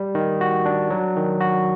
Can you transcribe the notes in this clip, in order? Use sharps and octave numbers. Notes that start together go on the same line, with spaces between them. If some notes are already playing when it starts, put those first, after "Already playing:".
Already playing: G3
D#3
F#4
D4
F#3
D#3
F#4